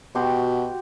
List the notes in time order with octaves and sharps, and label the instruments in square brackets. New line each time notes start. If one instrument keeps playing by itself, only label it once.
[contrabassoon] B2 [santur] F#4 G4 C6